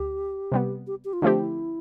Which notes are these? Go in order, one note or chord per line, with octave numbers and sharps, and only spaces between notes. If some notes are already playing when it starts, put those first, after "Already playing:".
Already playing: D2 G4
C3 G3 B3
G4
G4
F4
D3 F3 A3 C4 D4 G4
E4